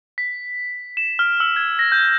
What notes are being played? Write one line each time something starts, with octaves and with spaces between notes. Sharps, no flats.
B6
E7
F6
E6
G#6
A#6
G6